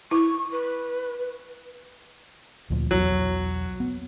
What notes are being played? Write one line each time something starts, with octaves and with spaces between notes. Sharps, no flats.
E4 C#6
B4
D2 A#2 F3
B1 E2 B2 F#3
B3